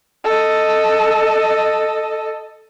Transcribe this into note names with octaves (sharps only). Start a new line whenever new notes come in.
A4 D#5